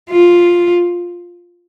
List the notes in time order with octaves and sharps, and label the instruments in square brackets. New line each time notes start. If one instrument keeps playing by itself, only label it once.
[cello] F4